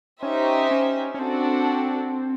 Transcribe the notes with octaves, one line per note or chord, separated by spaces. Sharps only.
C#4 D#4 G4 C5 E5
C#4
C#4
C4 D4 F#4 A4